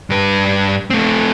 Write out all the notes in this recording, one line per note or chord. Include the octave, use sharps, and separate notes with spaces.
G2 B4
A3 C4